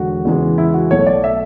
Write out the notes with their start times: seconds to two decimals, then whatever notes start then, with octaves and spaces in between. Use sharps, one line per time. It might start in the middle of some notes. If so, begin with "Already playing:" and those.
Already playing: E1 D3 F#4
0.25 E2 C#3 E3 G#3
0.58 E4
0.74 F#4
0.90 B1 B2 A3 C#5
1.07 D5
1.24 E5